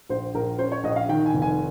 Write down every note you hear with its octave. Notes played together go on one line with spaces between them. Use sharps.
A#1 C5
A#1 A#4
C#4 C5
C#5
A#1 D#5
F5
D#3 G5
G#5
F1
G#5